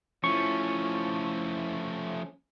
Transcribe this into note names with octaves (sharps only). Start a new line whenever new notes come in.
F3 A3 C#4 E4 F4 C#6